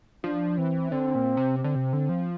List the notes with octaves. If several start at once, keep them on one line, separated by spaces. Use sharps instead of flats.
F3 D4
E3 C4
D3 C4
A#2
C3
C4
D3
C3
D3
F3